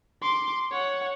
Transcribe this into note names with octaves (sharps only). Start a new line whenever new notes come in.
C6 D6
C#5 F#5